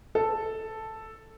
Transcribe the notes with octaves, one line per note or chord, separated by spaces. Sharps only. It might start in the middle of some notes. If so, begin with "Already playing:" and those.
A4